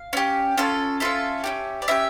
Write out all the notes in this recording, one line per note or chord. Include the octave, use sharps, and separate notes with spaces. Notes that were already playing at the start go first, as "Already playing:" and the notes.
Already playing: F5
C#4 G4
C#4 F4 A4
C#4 F4 A4 E5
C#4 E4 G4
D5
C#4 E4 G4 E5